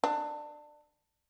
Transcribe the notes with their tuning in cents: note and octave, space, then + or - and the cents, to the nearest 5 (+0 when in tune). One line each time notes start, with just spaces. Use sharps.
D4 +20